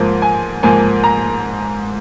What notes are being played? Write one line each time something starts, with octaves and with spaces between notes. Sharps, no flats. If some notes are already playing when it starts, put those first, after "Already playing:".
Already playing: G#2 F3 A#3
G#5
G#2 F3 A#3 G#5
A#5